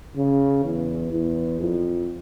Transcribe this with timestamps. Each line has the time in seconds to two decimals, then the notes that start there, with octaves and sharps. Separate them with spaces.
0.17 C#3
0.64 E2
1.12 E2
1.60 F2